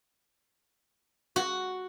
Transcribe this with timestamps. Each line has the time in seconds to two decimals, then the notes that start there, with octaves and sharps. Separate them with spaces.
1.36 F#4